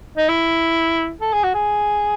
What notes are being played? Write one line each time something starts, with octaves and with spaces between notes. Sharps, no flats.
D#4
E4
A4
G#4
F#4
G#4